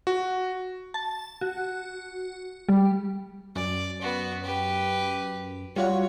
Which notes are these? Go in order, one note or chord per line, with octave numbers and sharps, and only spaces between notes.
F#4
A5
F#4
G3
F#2 D5
B3 F#4
G4 B4
G3 F4 F#4 C#5